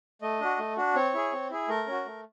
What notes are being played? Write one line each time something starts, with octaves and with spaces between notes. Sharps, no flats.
A3 D#5
D4 F#4
A3
D4 F#4
C4 C#5
E4 G#4
C4
E4 G#4
A3 A#4
C#4 F#4
A3